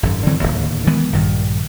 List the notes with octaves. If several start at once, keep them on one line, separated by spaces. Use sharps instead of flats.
G#1 F#2
D3 E3 F#3 C4
D1 G#1 D#2
D#3 E3 G#3 B3
A#1 G2 D#3